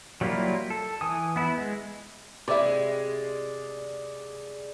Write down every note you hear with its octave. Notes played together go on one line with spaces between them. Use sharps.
F#3 G3 A#3 E4 F4
A4
E3 G#5 D#6
B3 E4
G#3
C3 G#3 E4 G4 D5 E5